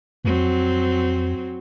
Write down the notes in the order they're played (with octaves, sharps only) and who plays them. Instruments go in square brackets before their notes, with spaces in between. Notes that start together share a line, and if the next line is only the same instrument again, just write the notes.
[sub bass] F2 [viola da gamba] F#3 C4